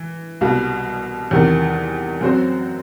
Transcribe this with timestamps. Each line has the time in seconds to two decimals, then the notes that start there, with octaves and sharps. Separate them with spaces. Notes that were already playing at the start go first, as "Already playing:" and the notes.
Already playing: E3
0.41 C2 B2 G3
1.31 E2 C3 D#3
2.21 F#2 F#3 C4 F#4 C5